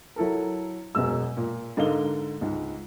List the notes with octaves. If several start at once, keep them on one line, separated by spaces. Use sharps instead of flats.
F#3 E4 A4 A#4
E1 F#2 B2 G#3 E6
A#2
G#2 D3 A#4 D#5 F5 G7
C#2 G#2